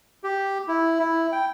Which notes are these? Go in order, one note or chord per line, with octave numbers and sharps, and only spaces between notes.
G4
E4
E4
G5